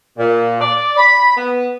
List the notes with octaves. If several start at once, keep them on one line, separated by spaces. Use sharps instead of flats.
A#2
D5
B5
B3